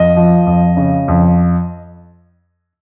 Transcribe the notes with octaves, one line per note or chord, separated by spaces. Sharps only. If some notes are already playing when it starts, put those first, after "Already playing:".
Already playing: F2 D#5
F3
F2
C#3
F2